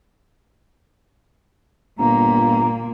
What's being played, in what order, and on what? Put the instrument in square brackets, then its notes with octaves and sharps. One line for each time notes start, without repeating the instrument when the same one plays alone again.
[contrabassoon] G1 [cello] A#2 A#3 [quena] A#5